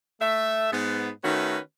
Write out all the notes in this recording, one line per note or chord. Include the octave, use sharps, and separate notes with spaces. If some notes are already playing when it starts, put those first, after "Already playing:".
A3 E5
G#2 B3
D#3 A3 C#4 F#4 B4